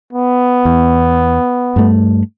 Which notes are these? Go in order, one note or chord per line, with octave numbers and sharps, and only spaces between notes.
B3
E2
G2 A3